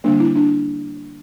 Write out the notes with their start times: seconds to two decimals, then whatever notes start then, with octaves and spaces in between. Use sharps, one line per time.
0.04 D3 G3 A#3 D4
0.20 E4
0.36 D4